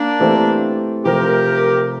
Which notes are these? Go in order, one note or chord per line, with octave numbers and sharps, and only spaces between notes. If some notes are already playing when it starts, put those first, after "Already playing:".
Already playing: A#3 D4
E3 A3 C4 G4
C3 F3 A3 G4 A#4